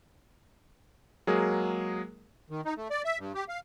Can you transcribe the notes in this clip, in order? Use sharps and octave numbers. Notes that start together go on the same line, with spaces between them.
F#3 G#3 A#3 G#4 A#4
D#3
D#4
A3
D5
E5
G2
G4
F5